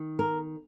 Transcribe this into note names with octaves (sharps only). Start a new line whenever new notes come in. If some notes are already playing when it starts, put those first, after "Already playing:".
Already playing: D#3
A#4